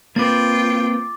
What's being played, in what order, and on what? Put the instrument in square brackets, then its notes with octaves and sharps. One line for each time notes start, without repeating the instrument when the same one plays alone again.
[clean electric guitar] A#3 C4 B4 [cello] F4 G5 [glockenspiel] D6 A6